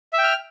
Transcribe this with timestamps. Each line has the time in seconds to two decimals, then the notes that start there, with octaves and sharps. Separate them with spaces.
0.13 E5
0.18 G5
0.23 F6